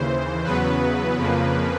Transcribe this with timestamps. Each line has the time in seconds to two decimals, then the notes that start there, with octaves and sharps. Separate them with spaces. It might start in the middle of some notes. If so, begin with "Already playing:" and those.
Already playing: D#2 C#3 E3 C5
0.44 E2 C#3 F#3 B3 B4
1.17 F2 C#3 F3 A#3